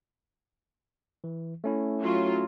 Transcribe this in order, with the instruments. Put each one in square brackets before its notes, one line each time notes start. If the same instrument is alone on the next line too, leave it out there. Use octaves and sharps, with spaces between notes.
[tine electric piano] E3
A3 C#4 E4
[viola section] F#3 F4